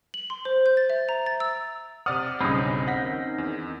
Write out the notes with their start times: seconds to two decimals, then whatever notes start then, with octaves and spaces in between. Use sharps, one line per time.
0.14 F#7
0.30 C6
0.45 C5
0.66 G6
0.77 A6
0.90 E5
1.09 A#5
1.26 A6
1.40 E6
2.06 C3 D5 F#5 D#6 F6
2.41 B1 G2 C#3 C4 C#4 D#4 B5 D#6
2.87 F#5 G6 A#6 B6
3.02 D#3
3.38 E2